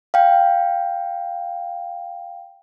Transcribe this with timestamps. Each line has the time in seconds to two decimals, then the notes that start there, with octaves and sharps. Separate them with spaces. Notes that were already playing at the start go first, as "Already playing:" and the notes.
0.14 F5 G5